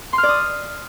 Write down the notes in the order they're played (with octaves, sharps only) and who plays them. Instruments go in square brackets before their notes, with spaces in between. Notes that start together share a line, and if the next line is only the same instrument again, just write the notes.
[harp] C6
F6
D5
D#6